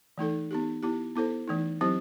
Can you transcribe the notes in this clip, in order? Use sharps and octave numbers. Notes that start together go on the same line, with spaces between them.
E3 A3 D#4 A4
B3 D#4 G4
B3 E4 G4
B3 E4 A4 C5
E3 A3 D#4
F#3 C4 E4 G4 C5